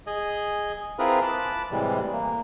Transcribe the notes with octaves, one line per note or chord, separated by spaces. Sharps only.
G#4 D#5 G#5
C4 E4 F4 G#4 A#4 B4
A5 B5 D6 F#6
A2 C3 E3 G3 G#3
A#3